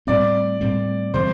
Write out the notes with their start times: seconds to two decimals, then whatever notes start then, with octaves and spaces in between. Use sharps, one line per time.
0.07 A2 G3 C4 D5
0.61 A2 G3 C4
1.14 C3 E3 G3 C4 C5